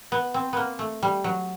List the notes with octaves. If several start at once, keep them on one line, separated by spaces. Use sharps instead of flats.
B3
C4
A#3 B3
A3
G3
F#3